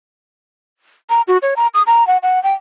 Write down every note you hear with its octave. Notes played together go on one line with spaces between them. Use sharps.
A#5
F#4
C#5
A#5
D#6
A#5
F#5
F#5
G5